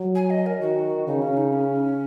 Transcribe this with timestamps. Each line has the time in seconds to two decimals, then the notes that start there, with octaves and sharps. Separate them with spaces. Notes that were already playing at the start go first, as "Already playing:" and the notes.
Already playing: F#3
0.15 G#5
0.30 D#5
0.46 A#4
0.61 D#3 F#4
1.07 C#3 D#4
1.22 C#4
1.37 D#4
1.53 C#4